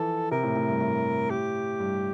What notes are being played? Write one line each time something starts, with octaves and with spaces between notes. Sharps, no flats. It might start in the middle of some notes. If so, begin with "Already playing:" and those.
Already playing: E3 F3 A4
C3 A#4
A2
A2
G2
A2
G4
G2